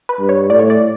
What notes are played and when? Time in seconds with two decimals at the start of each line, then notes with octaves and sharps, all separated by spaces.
0.09 B4
0.19 G2
0.29 C#5
0.50 A2 D5
0.59 C#5
0.70 D5